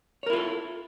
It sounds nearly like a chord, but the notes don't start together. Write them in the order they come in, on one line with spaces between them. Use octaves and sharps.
C#5 A#4 E4 F4 A4